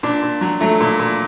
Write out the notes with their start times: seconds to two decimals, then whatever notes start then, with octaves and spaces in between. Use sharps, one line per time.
0.03 A#2 D4
0.23 A#2
0.41 F#3
0.61 F#3 A3
0.81 A#2
0.99 A#2